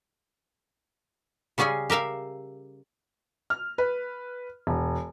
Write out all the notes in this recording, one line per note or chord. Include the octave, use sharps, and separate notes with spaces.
C#3 G3 C#4 G#4 G#5
G4 A#4 E5 F5
F6
B4
E1